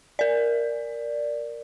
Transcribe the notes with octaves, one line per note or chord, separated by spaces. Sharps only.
A#4 D5